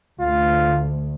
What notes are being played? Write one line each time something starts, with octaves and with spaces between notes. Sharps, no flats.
D2 F4